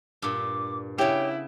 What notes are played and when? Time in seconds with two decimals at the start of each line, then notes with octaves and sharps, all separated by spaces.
0.22 G2 A#2 D6
0.98 C#3 B3 E4 G4 C#5